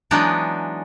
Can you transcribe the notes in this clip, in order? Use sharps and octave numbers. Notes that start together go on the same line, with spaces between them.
E3 F#3 G#3 B3 D4 D#4